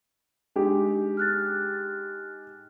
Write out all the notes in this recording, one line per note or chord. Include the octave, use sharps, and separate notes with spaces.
G#3 D4 D#4 G4
F6 F#6 A6